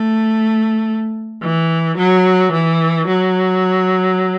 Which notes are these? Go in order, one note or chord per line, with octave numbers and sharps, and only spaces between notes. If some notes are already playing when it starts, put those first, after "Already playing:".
Already playing: A3
E3
F#3
E3
F#3